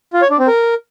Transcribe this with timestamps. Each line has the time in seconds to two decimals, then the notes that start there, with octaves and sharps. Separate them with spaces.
0.13 F4
0.22 C#5
0.30 D4
0.39 C4
0.47 A#4